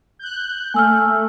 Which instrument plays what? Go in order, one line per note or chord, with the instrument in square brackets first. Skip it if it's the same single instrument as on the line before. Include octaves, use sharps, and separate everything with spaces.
[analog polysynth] F#6 G6
[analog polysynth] A3 [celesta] G#5 E6 F6